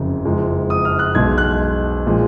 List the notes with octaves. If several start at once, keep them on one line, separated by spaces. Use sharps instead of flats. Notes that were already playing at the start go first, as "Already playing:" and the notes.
Already playing: F#1 F2 C#3
F#1 F2 F3 G#3
D#6
F6
F#6
B1 B2 G#3 G#6
F#6
A#2 F3 G#3